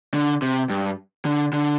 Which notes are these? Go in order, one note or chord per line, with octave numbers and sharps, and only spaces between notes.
D3
C3
G2
D3
D3